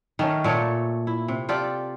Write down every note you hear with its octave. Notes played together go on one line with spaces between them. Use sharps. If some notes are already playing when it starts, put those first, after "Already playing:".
D#3 A3 C#4
A#2 A3 A4 C#5
E4
C3
F4 G4 A4 D5